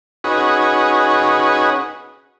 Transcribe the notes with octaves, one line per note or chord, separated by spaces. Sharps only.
C#4 D#4 F#4 G#4 B4